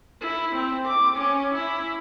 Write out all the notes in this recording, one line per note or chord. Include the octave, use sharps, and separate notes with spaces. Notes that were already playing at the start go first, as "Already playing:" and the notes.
E4
C4
D6
C#4
E4